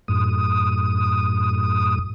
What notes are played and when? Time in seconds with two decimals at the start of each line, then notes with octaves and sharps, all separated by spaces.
0.08 F#2 A2 D#6